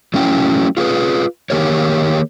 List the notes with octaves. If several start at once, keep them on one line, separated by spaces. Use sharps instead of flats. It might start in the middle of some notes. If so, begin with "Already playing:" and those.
F#3 A3 C#4 E4 G5
F4 G#4 A#4 B4
D#3 A#3 G4 G#4 A#4 C#5